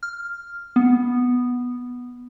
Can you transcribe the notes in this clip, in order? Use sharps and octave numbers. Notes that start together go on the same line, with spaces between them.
F6
B3